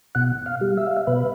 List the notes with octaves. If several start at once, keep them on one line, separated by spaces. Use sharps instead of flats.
B2 F#5
F5
G3
E5
F5
E5
B2 B4